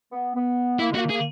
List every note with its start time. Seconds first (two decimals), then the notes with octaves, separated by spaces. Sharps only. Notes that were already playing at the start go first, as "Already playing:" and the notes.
0.12 B3
0.34 B3
0.79 A#3 E4
0.91 G#3
0.95 A#3 F#4
1.10 A#3 G#4